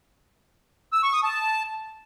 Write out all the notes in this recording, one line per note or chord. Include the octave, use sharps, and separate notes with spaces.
E6
C#6
D#6
A5